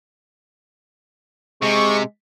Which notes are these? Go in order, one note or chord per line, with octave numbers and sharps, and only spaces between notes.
C3 G#3 C#6